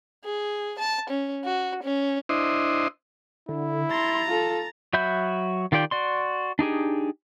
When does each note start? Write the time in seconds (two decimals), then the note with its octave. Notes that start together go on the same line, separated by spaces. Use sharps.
0.25 G#4
0.79 A5
1.10 C#4
1.45 F#4
1.84 C#4
2.29 D4 E4 C5 D#5
3.49 D3 E4
3.91 A#5 C6 A6
4.27 F4 A4
4.93 F#3 F#4 E5 B5 G6
5.72 D#3 F4 G4 D5 G5
5.91 F#4 D5 C6
6.59 D4 D#4 G4 G#4